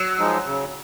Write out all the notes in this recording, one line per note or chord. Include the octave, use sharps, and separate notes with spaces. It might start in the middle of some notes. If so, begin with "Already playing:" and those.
Already playing: F#3
F3 G#3 D#4
C#3